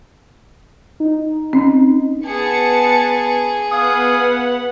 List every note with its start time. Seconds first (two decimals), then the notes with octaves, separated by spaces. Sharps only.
1.00 D#4
1.53 C4 C#4
2.26 B3 G#4 A5 C#7
3.72 B3 F5 F#5 G#5 D#6